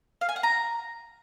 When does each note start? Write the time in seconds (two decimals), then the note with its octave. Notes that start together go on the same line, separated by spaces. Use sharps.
0.21 F5
0.29 G#5
0.36 F#5
0.43 A#5